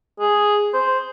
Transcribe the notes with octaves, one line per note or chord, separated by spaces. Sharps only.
G#4
C5